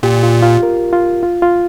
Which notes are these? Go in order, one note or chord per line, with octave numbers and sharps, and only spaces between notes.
A#2 G4
F4
F4
A#4
F4
F4
F4